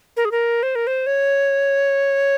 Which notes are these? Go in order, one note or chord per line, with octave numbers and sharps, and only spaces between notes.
A#4
G#4
A#4
C5
A#4
C5
C#5